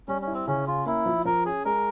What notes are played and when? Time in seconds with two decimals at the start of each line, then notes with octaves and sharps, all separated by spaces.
0.08 G3 C#4
0.22 C#4
0.27 E4
0.34 C4
0.47 C#3 C#4
0.67 C#4 F4
0.86 A#3 E4
1.06 F3
1.25 F3 A#4
1.46 C#4 G#4
1.65 G#3 A#4